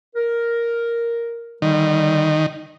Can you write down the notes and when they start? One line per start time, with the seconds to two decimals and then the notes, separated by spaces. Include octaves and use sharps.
0.15 A#4
1.62 D3 D#3 G3